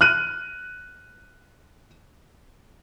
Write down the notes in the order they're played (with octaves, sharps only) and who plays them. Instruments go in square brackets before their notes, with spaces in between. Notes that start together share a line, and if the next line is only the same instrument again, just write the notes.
[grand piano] F6 F#6 D#7